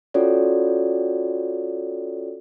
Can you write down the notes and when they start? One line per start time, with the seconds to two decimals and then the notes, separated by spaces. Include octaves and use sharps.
0.14 C#4 F4 F#4 A4 C#5 D5